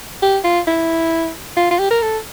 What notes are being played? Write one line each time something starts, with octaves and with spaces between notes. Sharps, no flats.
G4
F4
E4
F4
F4
G4
A#4
A4